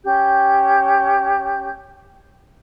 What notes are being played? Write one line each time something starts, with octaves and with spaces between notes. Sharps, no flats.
C#4 G4 G6